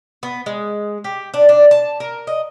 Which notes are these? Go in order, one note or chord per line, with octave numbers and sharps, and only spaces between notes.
B3
G#3
G4
D4
D4
A5
A#4
D#5